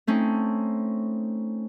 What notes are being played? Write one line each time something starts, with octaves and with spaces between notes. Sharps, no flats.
A3 C4 C#4 D#4